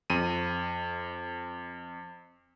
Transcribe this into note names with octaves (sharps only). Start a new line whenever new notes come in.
F2 D#7